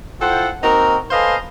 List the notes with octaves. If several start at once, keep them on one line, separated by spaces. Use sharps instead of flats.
E4 F4 A4 C5 F#5 G5
A#3 C4 D#4 F#4 A#4
A4 B4 C5 D#5 F5 G#5